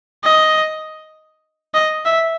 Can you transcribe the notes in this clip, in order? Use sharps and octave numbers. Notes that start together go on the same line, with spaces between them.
D#5
D#5
E5